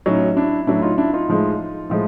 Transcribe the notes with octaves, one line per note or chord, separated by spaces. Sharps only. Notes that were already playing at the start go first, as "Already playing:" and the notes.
A2 F#3 C#4 D#4
D4 E4
A2 F#3 D4 E4
D#4 F4
D4 E4
D#4 F4
A2 F3 G#3
A2 F3 G#3